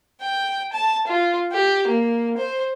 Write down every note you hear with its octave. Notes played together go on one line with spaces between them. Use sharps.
G5
A5
F4
G4
A#3
C5